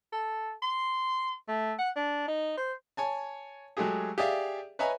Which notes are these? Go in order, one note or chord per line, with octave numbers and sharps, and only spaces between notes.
A4
C6
A3
F#5
D4
D#4
C5
C#5 G#5 A5
F#3 G#3 A3 G4 G#4
G4 G#4 D5 E5 F5
B4 C#5 D#5 E5 G#5 A#5